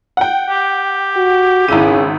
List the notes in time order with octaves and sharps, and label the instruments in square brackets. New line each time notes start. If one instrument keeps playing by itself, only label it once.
[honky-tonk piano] F#5 G5
[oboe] G4
[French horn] F#4
[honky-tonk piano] G#1 E4 D#7 [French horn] C#3